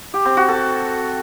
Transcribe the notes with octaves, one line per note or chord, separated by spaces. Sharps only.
G4
C4
F#4
A4